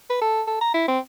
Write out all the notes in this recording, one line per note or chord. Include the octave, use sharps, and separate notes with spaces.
B4
A4
A4
A#5
E4
C4